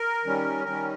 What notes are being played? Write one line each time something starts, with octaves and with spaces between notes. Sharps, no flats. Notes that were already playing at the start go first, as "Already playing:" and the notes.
Already playing: A#4
D#3 G3 C#4
D#3 G3 C#4 A#4